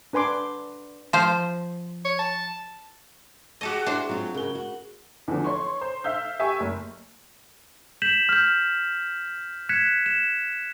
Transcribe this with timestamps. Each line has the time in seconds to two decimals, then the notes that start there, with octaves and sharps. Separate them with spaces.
0.13 D4 B4 G#5 C6 D6
1.13 F3 C5
2.05 C#5
2.19 A5
3.61 G#3 F#4 G4 A4 D#5
3.86 D4 E4 C5 E5
4.09 F#3 C4 F4
4.34 C#3 G#4 A#4 G7
4.55 F#4
5.28 E2 D3 F3
5.44 C#5 C6 C#6
5.81 C5
6.04 E5 F5 E6 G6
6.39 G4 E5 G#5 C#6
6.60 F#1
8.02 G6 B6 E7 F#7
8.29 F6 G6
9.69 F#6 G#6 B6 C#7 E7
10.06 E7